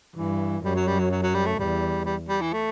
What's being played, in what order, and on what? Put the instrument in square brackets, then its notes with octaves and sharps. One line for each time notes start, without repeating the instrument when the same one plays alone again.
[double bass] G2 [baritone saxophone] E3
[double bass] F#2 [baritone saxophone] G3
[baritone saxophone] F#3
G3
F#3
F#3
F#3
G3
A3
[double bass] E2 [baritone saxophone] G3
[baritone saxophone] G3
G3
E3
A3